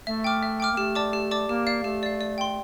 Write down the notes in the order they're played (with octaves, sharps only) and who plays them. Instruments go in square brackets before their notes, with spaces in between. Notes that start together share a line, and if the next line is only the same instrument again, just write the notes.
[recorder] A3 [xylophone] E5
[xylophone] G5 D6 F6
E5
G5 D6 F6
[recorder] A#3
[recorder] A3 [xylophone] G4
[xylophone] D5 A5 D6
G4
D5 A5 D6
[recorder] A#3 [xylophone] G4
[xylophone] D5 F5
[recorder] A3 [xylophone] G4
[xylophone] D5 F5
D5
G5 C6